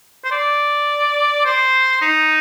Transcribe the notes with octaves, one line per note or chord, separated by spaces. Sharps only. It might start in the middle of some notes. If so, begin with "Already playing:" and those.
C5
D5
C5
D#4